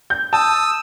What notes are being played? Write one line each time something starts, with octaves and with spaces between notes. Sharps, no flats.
G6
A5 D#6 E6